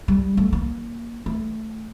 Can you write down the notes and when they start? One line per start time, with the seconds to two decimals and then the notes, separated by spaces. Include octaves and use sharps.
0.08 G3
0.37 A3
0.53 A#3
1.26 A3